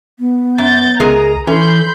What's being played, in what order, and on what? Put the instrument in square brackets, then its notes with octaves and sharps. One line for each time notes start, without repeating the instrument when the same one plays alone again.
[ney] B3
[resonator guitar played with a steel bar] F#2 [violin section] G6 A6
[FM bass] C#2 [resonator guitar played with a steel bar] G#3 G#4 A#4 [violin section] A#5 D#6
[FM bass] E3 [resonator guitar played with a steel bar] C#4 [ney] A4 [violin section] B5 C6 G6